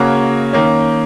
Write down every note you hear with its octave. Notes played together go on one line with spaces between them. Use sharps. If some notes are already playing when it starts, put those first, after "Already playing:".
Already playing: C#3 A#3 F#4 C#5
D#3 A#3 C#4